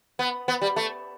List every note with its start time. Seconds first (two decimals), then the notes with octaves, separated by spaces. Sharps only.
0.19 B3
0.48 B3
0.62 G3
0.76 A3